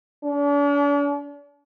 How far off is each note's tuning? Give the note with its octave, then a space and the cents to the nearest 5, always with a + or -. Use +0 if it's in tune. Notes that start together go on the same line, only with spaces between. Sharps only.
D4 -45